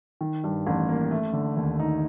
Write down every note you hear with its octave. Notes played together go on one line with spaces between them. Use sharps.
D#3
G2
A1
A#3
A3
D3
D#2
D#4